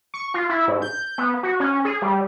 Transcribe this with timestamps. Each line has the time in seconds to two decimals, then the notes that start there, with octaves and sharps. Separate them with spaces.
0.14 C#6
0.34 F4
0.49 E4
0.68 G#2
0.82 G6
1.18 B3
1.43 F#4
1.60 C#4
1.85 G#4
2.02 G3